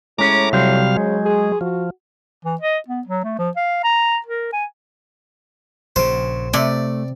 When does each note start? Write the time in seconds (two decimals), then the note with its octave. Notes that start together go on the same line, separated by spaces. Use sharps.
0.19 A2 G#3 C#4 A#5 D6
0.53 C3 F#3 G3 C5 F5
0.97 C#3 G#3
1.25 G#4
1.61 F3 F#4
2.45 E3
2.61 D#5
2.88 B3
3.07 F#3
3.24 A3
3.39 F3
3.56 F5
3.84 A#5
4.26 A#4
4.53 G#5
5.96 A#1 C#3 C5
6.54 C3 A3 D5